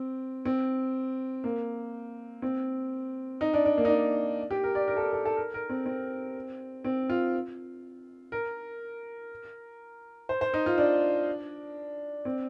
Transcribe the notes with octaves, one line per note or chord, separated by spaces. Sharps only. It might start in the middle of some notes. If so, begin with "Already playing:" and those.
Already playing: C4
C4
A#3
C4
D#4
D4
D4
A#3
D#4
D4
G4
A#4
D5
A#4
A4
A#4
A4
A4
A#4
A#4
C4
C4
C4
F4
A#4
C5
C5
D#4
F4
D4
C4